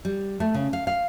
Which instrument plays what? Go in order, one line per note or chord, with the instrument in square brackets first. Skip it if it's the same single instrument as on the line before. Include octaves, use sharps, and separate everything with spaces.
[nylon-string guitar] G3
A3
C#3
F5
F5